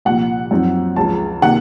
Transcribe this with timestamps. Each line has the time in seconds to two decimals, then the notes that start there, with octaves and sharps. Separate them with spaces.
0.05 C2 A#2 F3 F#5
0.51 F#2 F3 C4 D#4
0.96 C#2 C#3 F3 A5
1.42 C3 D#3 A#3 D#4 F#5